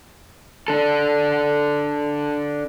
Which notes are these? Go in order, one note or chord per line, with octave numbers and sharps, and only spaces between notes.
D4 A4